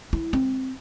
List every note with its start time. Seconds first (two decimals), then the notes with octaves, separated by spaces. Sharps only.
0.13 E4
0.33 C4